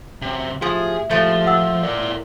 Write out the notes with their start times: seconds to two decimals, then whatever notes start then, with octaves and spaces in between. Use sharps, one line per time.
0.22 F#2 C3
0.62 A2 F3 G4 G#4 E5
1.11 F3 G#3 A3
1.47 F#5 E6
1.83 A2 A#4 D5